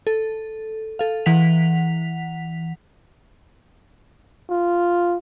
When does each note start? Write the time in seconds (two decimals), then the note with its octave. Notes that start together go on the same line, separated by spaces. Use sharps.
0.07 A4
0.99 A4 F5
1.26 E3 F#5 B6 F7
4.50 F4